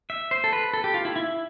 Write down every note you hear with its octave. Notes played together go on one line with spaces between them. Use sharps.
E5
C5
A4
B4
A4
G4
F4
E4
E4